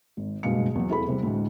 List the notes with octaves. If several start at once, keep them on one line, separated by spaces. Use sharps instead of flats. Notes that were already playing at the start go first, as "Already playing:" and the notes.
G#1
F#1 G2 B2 G#3 F5 C#7
E2 F#3
C4 E4 G#4 A4 B5
C3 G3
D2 A2 G#3